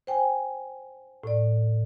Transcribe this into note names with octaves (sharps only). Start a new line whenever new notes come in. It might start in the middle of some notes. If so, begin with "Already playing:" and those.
C5 G5 G#5
A2 D5